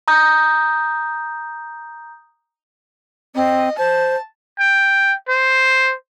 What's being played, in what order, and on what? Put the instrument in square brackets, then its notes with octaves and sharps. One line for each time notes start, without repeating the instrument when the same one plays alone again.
[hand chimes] A#5 D#6 G6
[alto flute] C4 [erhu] D#5
[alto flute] C5 [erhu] A5
[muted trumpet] G5
C5